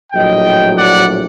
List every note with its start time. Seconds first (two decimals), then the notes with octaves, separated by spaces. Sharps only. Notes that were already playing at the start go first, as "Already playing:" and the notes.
0.13 A#1 A2 F#3 D#5 G5
0.77 D5 F#5